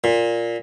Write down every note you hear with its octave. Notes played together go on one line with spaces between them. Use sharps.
A#2